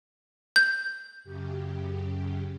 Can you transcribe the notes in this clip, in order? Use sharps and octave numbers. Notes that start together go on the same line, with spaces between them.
G6
F#2 C#3 G4